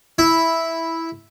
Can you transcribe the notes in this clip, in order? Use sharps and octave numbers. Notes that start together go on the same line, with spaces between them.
E4